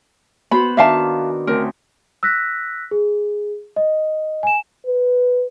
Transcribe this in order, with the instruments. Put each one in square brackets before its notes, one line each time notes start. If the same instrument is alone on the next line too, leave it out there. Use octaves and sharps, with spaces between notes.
[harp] B3 F#4 C5 [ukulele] B5
[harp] D#3 D4 [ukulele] E5 F5 A5
[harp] D2 C4 C#4 [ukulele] A#4
[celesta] E6 F#6 A#6 B6
G#4
D#5
G#5 E7
[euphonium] B4